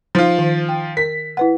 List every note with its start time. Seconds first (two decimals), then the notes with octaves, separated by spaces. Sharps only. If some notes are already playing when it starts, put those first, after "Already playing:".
0.15 F3 D#4 F4
0.39 D#3
0.69 G5
0.97 A#4 B6
1.37 E4 B4 F#5